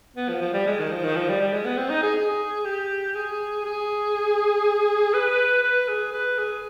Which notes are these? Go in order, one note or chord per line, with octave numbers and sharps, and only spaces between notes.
B3
F3
F3
G3
G#3
D#3
F3
D#3
F3
G3
G3
G#3
B3
C4
D#4
G#4
G#4
G4
G#4
G#4
B4
B4
G#4
B4
G#4